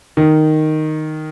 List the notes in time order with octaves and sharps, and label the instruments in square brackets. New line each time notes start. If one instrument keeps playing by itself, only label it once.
[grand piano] D#3